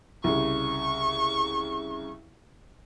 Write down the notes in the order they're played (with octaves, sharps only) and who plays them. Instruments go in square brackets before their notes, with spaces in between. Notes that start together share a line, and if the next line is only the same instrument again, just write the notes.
[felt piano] C2 C#3 [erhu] C#6